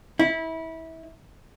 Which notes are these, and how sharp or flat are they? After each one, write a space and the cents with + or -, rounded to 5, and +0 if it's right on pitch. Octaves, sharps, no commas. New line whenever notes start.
E4 -25